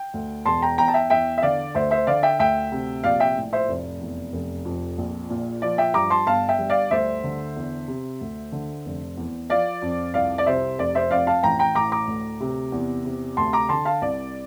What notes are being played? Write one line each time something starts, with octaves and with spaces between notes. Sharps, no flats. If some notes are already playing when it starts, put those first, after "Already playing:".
Already playing: G5
D2
E1 A5 C6
G5 A#5
E2 G5 A#5
A5
E5 G5
E2 E5 G5
E5
D3 D5 F5
D2 C5 E5
C5 E5
D3 D5 F5
E5 G5
D2 E5 G5
C3
A#1 D5 F5
E5 G5
A2
C5 E5
F1
E2
F1
F2
A#1
A#2
F3 D5
E5 G5
G2 A#5 D6
A5 C6
G1 F5 A5
E5 G5
G2
D5 F5
D2 C5 E5
D3
E2
C3
D2
D3
F1
E2
F3 D5 F5
F2
C2 D5 F5
D5
C3 C5 E5
F1 D5
C5 E5
F2 D5 F5
F5 A5
A1 G5 A#5
G5 A#5
A2 A#5 D6
A#5 D6
D2
C3
E2
C3
D2 A5 C6
A#5 D6
D3 A5 C6
F5 A5
C2 D5